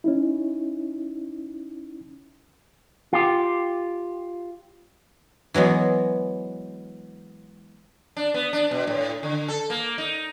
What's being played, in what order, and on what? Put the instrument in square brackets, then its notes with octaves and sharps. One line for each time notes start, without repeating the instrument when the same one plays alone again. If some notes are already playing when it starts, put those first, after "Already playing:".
[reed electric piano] C#4 D#4 E4
[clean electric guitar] F4 G4
[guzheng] E3 F#3 G#3 B3
[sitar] D4
B3
D4
B2
A2
D3
A4
A#3
D#4